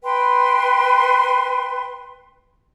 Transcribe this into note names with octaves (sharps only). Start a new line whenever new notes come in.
B4 G5 C6